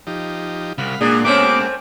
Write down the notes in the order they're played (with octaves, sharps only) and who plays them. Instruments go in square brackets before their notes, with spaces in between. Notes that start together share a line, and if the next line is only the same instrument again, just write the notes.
[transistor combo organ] F3 D#4 G4
[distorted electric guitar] C2 [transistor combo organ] F5 F#5 B5
[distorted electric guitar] A#2 [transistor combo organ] G#3 A#3 F#5 [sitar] D4 [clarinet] G#4
[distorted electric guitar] B2 [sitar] A3 C4 C#4 [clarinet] D6